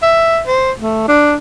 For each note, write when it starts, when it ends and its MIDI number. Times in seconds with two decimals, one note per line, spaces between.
0.02 0.41 76
0.48 0.72 72
0.80 1.06 57
1.08 1.36 62